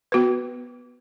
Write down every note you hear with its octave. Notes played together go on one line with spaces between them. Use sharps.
B3 F#4 B4